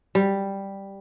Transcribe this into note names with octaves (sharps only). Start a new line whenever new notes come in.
G3